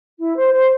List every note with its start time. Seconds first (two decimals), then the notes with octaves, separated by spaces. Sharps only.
0.18 E4
0.36 C5
0.53 C5